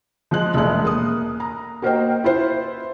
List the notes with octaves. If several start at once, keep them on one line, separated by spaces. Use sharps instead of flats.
F3 G#3 F#6
E1 G#3 A3 F#6
A#3 D#6
A#5
A#3 F#4 A#4 C5 D#5 G5
E4 F4 B4 C5